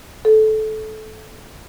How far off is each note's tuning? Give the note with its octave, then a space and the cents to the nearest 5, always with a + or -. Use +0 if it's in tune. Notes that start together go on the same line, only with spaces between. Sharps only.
A4 -20